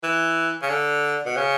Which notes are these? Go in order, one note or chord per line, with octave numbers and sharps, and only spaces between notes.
E3
C#3
D3
B2
C#3